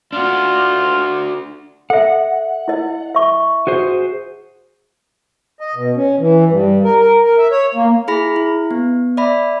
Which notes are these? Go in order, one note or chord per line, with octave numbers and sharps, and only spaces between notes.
D4 F4 F#4
A4 E5 F#5
E4 D#5
E5 C#6
F#4 G#4 C5
D#5
B2
C#4
E3
G2
A#4
A#4
A#4
E5
C#5
A#3
E4 G#4 B5 A#6
E4
B3
D5 E5 B5